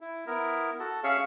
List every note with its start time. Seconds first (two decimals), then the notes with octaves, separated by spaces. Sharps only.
0.01 E4
0.27 B3 E4 A#4
0.80 F#4 A4
1.04 C#4 G#4 C#5 E5 F5 C#6